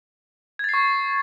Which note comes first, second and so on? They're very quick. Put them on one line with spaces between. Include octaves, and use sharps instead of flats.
G#6 A6 C7 C#6